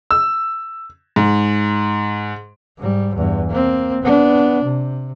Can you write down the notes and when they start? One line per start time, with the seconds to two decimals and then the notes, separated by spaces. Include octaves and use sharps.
0.11 E6
1.16 G#2
2.78 G#2 G3
3.16 E2 G2
3.50 A#3 C4
4.02 B3 D4
4.64 C3